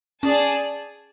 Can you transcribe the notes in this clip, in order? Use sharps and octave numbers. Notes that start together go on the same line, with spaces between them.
C#4 G#4 D5 A5